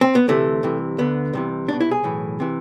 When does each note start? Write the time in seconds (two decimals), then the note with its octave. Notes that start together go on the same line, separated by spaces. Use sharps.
0.01 C4
0.15 B3
0.28 D2 C3 E3 A3
0.63 C2 C3 E3
0.98 D2 D3 B3
1.33 C2 C3 E3
1.68 C2 D4
1.73 B2
1.81 E4
1.91 G#4
2.04 B1 A2 E3
2.40 C3 E3